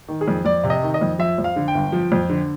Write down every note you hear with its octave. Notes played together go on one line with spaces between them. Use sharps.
D#3
G#4
F2
F2 D5
C3
D#5
D#3
D#5
F2
F3 E5
F2
F5
D3
G5
G1
F3
F2
D3